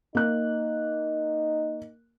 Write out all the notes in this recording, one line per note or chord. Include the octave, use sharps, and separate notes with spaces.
A#3 D#4 F#6